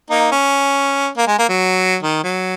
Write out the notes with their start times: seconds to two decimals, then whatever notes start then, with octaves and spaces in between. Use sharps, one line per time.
0.10 A#3 D#4
0.32 C#4
1.17 A#3
1.27 G#3
1.38 A#3
1.48 F#3
2.02 D#3
2.24 F#3